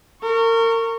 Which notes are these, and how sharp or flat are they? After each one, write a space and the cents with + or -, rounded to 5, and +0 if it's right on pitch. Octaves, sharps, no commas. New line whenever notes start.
A#4 -30 C#6 +0